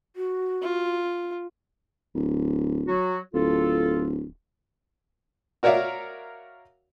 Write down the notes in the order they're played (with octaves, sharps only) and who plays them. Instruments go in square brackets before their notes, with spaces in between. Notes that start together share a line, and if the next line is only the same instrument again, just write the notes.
[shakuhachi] F#4
[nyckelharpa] F4
[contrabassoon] D1
[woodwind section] F#3 F#4
[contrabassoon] D1 [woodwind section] F4 A4
[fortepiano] F#4 A#4 C#5 D5 E5 F5